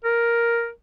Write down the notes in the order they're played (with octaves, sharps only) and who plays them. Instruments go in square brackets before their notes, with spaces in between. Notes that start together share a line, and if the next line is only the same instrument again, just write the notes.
[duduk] A#4